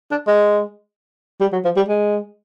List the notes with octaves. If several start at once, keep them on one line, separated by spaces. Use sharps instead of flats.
D4
G#3
G3
F#3
F3
G3
G#3